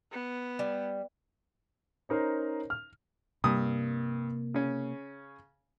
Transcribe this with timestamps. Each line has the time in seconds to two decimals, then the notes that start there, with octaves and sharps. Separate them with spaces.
0.12 B3
0.59 G3
2.09 C#4 D#4 A#4 C5
2.70 F6
3.44 G2 C3 A#3 D#6
4.54 C#3 C#4